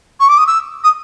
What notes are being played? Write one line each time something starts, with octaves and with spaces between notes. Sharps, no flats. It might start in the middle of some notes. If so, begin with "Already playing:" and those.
C#6
D6
D#6
E6
D#6